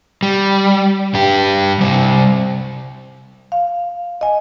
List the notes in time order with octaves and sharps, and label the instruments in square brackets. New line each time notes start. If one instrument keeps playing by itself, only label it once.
[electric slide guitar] G3
G2 G4
C3 G3
[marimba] F5
D#5 G#5